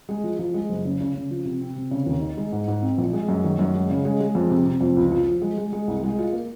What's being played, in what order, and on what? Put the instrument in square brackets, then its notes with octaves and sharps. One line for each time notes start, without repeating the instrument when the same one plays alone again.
[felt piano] G#3
F3
F3
G#3
F#1
C#3
C#3
C#3
F3
C3
C4
C3
C#3
D#2
D#4
G#3
G#2
G#2
C4
A#1
G#3
F#2
D#3
F#2
G#3
C#3
G#3
G#3
F2
C3
C3
F2
C#2
F3
F3
G#3
G#3
G#3
C2
G#3
F4
A#3